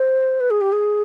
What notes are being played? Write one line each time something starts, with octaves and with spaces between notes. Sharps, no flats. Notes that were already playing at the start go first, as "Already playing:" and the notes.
Already playing: C5
B4
G#4
G4
G#4